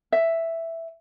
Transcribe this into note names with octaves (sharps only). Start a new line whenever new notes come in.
E5